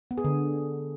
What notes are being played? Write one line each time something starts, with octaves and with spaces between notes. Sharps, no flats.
B3
G#4
D3